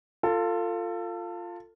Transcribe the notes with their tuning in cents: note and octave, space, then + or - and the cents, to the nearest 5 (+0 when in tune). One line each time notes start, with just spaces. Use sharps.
F4 +0 A4 +25